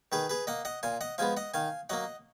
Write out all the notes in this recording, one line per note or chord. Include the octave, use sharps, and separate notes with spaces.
D#3 G#4 B4
G#4 B4
A#3 D#5 F#5
D#5 F#5
A#2 F5 G#5
D#5 F#5
F3 G#3 B3 F5 G#5
D#5 F#5
D#3 F5 G#5
F#3 A#3 D#5 F#5